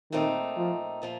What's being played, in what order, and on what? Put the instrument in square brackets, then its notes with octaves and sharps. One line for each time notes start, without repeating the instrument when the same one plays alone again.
[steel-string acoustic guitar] A#2 A3 C4 D#4 [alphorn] D#3
[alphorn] F3
[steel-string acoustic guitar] A#2 F3 A#3